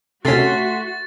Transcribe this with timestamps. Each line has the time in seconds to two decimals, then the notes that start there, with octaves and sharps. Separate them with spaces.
0.25 C3 A3 C#4 F#4 C6 A6 B6